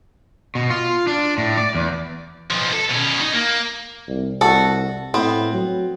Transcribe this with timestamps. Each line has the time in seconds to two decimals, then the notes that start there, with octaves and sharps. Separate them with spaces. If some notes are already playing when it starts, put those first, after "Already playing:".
0.55 B2
0.70 F4
1.07 D4
1.38 A2
1.57 D5
1.75 E2
2.50 B1 F3
2.73 A4
2.91 B2 C#4
3.21 D#4
3.34 A#3
4.08 C2
4.41 C2 F#4 A4
5.14 A2 B3 C4
5.54 F#3